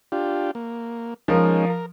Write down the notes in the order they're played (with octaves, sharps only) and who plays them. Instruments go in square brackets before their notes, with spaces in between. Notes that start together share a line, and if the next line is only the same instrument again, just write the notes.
[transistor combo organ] D4 F4 G4
A#3
[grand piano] F3 A#4 [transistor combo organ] G#3 C#4 D#4
[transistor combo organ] A#4